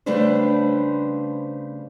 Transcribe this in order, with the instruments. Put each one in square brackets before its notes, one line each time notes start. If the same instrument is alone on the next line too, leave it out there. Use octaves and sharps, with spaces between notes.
[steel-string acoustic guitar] C#3 G3 A3 D4 B4 C5